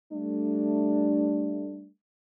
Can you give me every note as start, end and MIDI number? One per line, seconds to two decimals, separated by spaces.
0.13 1.88 55
0.13 1.88 57
0.13 1.88 62